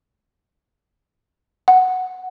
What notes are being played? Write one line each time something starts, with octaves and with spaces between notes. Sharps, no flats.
F#5